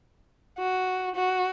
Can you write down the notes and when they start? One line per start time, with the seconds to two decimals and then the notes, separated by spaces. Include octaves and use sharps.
0.58 F#4
1.16 F#4